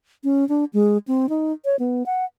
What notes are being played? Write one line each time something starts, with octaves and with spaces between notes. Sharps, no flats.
C#4
D4
G#3
C4
D#4
C#5
B3
F#5